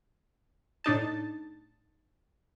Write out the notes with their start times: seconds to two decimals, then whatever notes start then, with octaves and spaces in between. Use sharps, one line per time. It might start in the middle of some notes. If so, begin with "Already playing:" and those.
0.84 A2 D4 D#4 A5